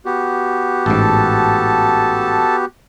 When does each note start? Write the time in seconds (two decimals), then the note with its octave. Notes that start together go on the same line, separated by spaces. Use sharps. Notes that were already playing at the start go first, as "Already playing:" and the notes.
0.05 B3 F#4 G4
0.86 A1 G#2 A4 A5